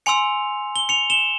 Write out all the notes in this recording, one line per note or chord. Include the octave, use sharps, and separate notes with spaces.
G#5 C6 E6 C#7 F7
G7
C#7 F7
E7 G7